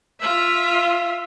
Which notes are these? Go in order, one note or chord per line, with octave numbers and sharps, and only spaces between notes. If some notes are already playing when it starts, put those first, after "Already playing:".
F4 E5